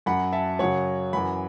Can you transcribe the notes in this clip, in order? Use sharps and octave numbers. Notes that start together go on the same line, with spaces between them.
F#2 F#3 F#5 B5
E5 A5
F#2 C#3 F#3 C#5 F#5
F#2 E3 F#5 B5